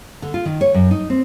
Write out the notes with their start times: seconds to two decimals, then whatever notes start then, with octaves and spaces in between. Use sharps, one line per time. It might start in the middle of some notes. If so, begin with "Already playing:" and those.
0.22 D3
0.34 F4
0.46 D#3
0.61 C#5
0.74 F#2
0.91 D#4
1.10 C4